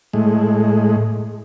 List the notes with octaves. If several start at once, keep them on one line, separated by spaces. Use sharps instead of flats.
A2 G#3